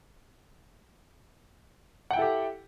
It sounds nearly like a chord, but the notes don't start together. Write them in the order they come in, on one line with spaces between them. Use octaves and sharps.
F#5 G5 E4 A4 G4